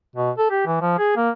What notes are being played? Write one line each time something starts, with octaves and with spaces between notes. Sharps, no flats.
B2
A4
G4
E3
F3
G#4
A#3